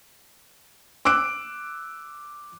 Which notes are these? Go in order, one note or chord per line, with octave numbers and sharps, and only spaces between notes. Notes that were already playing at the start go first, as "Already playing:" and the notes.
D6 E6 F#6 D7